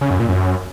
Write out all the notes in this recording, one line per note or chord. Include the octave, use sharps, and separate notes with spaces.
C#3
F#2
A#2
F#2